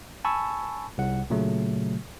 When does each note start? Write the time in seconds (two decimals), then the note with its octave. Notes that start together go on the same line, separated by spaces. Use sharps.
0.25 G#5 A5 B5 C#6 E6
0.98 C2 F#5
1.30 A#2 C#3 F#3 A3